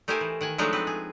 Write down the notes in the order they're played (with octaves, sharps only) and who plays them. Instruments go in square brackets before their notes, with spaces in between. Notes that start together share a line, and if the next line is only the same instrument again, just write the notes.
[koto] A3 D#4 G4 A#4 C5 G#5
E3
D#3 F#5 G#5
F3 F#3 G#3 A3 D4 D#4
C4 B4
G#4